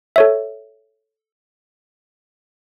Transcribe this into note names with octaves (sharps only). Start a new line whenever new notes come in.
A4 C#5 E5